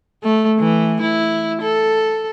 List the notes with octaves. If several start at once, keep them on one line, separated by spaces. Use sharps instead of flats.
A3
E3
E4
A4